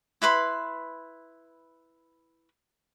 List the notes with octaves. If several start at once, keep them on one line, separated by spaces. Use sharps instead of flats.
E4 B4 B5 C6